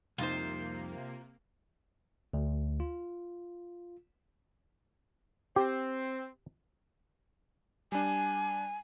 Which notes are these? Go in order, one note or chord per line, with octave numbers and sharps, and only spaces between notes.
C2 F2 C3 A#3 D#4 F4 C5
D2
F4
C4 G4
G3 D4 G#5